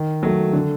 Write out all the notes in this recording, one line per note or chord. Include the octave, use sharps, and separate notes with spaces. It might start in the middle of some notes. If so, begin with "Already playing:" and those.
Already playing: D#3
F#3 A3
D3